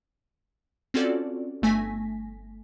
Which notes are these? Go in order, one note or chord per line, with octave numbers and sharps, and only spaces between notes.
C4 C#4 F4 F#4 A4 D5
G1 A3 G#5 A#6 B6